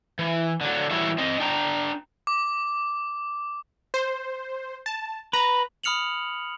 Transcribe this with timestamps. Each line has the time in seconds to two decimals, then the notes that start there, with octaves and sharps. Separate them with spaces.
0.19 E3
0.61 D3 F#3
0.91 E3 G3 E4 F#4 C#5 E5
1.18 C4 D#5
1.40 D4 G5 A#5
2.27 D6
3.94 C5
4.86 A5
5.33 B4 A#5
5.84 B5 D#6 F6 C#7 F7 F#7